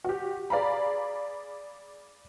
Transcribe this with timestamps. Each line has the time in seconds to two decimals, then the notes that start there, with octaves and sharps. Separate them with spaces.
0.04 F#4 G4
0.50 G#4 D5 F5 A#5 B5